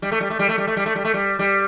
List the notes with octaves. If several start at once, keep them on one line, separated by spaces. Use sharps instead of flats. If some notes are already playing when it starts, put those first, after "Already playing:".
G3
A3
G3
A3
G3
A3
G3
A3
G3
A3
G3
A3
G3
G3